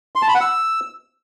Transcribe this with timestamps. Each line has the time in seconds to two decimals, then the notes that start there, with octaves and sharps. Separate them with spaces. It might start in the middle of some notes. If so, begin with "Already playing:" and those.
0.16 C6
0.22 A5
0.28 B5
0.35 F#5
0.41 E6